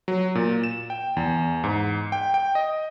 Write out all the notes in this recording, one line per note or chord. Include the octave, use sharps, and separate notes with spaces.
F#3
A#2
E7
G5
E2
G#2
G5
G5
D#5